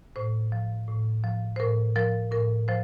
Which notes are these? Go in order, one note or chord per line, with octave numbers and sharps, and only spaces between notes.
A2 C5
F3
A2
F3
C5
A2 A#4
F3 A#4
A2 A#4
F3 C5